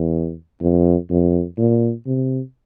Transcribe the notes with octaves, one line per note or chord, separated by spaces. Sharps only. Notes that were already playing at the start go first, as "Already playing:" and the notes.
Already playing: E2
F2
F2
A#2
C3